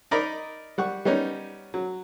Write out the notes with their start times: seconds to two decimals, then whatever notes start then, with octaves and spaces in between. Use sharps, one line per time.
0.11 D#4 A#4 D5 D#5 B5
0.78 G3 F#5 C#6
1.05 G3 B3 C#4 D#4
1.74 F#3